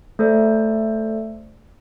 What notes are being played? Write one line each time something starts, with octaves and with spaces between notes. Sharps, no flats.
A3 A4 C5 D5